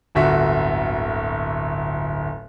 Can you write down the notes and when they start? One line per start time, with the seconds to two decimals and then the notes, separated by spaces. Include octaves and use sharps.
0.15 D1 G1 F#4 E5